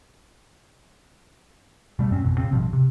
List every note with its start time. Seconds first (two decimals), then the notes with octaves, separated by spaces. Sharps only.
1.99 B2 G3 A3
2.11 F#2 C4 C#4
2.24 A1 F2 B2
2.38 A#2 C#3 C4
2.52 A1 G2 B2 F3
2.73 C3